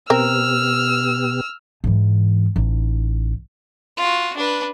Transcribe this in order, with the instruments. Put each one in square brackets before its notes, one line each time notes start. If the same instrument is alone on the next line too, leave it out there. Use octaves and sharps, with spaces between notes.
[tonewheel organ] B2 B3 G4 [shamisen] C4 A#4 [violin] E6 F6
[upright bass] G#2 E3
A1 D#4
[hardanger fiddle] F4 F#4
D4 B4